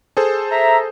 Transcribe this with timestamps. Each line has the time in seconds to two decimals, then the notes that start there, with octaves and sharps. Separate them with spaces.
0.17 G#4 A4 C5
0.52 E5 A#5